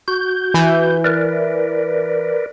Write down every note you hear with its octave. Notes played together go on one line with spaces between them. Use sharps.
F#4 G6
E3
A#4 B4 D5